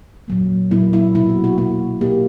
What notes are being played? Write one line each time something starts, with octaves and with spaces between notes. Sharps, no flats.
A#2 F#3 A#3
A#2 F#3 A#3 E4
E4
B2 A#3 E4
F#4
F#4
B2 A#3 F#4
B2 A#3 G4